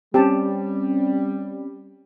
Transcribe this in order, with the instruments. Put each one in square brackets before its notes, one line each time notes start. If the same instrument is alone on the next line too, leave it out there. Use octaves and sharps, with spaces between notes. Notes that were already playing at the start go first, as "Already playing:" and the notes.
[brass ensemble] G3 [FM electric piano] C4 C#4 [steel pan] G4 A5